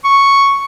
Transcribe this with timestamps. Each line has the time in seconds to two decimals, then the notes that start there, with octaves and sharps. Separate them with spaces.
0.04 C#6